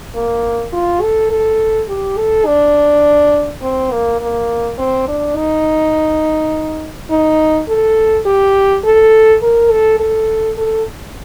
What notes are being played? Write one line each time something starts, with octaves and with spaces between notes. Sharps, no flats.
A#3
F4
A4
A4
G4
A4
D4
C4
A#3
A#3
C4
D4
D#4
D#4
A4
G4
A4
A#4
A4
A4
A4